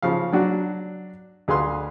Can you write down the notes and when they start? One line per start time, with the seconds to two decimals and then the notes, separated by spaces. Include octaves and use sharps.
0.02 C#3 F3 F5
0.33 F#3 D4 F#4
1.48 D2 G#4 B4 F5 C6